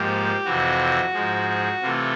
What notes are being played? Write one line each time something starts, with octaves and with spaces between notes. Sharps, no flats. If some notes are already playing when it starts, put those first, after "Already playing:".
Already playing: G#2 F3 A#3 G4
F2 C3 E3 F#4
G#2 F3 G#3
C3 E3 A3 F4